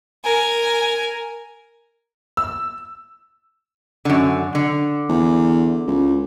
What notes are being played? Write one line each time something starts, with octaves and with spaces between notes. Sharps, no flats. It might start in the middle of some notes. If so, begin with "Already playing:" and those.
A#4 G#5
E6
F#2 D3
D3
E2
C#2